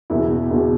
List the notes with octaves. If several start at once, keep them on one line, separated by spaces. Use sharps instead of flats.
E2 B2 E4
E2 B2